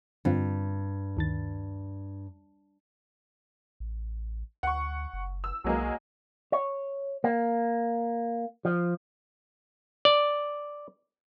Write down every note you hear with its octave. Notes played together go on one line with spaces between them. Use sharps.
G2 D3 C4 F4
D2 D#3 A6
A1
D2 F#5 C#6
F#1
E6
B1 F#3 G#3 A#3
C#5
A#3
F3
D5